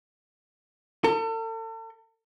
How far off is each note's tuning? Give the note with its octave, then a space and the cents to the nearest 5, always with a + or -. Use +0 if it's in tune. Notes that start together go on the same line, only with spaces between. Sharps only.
A4 +40